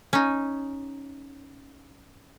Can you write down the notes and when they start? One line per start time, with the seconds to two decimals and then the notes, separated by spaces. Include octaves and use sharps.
0.13 C#4 D#4